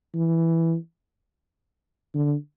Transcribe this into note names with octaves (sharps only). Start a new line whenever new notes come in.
E3
D3